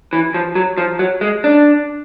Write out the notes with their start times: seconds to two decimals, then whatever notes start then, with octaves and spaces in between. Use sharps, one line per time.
0.13 E3
0.34 F3
0.55 F#3
0.77 F3
0.99 F#3
1.21 G#3
1.44 D4